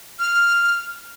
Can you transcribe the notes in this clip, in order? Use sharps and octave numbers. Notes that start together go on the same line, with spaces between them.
F6